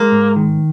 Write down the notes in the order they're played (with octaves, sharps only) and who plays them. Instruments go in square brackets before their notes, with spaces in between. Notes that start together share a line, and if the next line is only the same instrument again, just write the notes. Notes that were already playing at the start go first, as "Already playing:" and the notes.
Already playing: [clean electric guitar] G#3 [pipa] A#3
[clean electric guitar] G#2
D#3